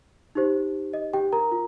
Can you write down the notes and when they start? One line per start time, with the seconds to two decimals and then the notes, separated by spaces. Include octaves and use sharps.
0.35 D#4 G4 C5
0.93 D#5
1.13 G4 G5
1.33 A#4 A#5
1.52 F4